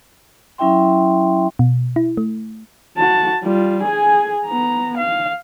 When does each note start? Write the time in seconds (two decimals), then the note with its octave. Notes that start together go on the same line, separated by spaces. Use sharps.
0.58 F#3 C#4 E4 E5 G5 C6
1.59 B2
1.96 E4
2.17 A3
2.97 F#4 A5
3.43 G3 F4
3.83 G#4 G#5
4.46 B3 A#5
4.97 F5